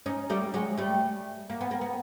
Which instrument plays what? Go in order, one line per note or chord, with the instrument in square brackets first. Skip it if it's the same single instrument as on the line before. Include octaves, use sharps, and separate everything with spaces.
[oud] C#4 D#4
G3 A3
F#3 G#3
G3 A3
A#3
B3
A#3
B3